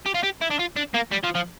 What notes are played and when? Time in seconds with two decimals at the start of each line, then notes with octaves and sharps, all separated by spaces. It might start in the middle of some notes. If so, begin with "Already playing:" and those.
0.06 G4
0.15 F4
0.23 G4
0.41 E4
0.50 D4
0.59 F4
0.76 D4
0.94 A#3
1.12 G3
1.24 F3
1.35 F3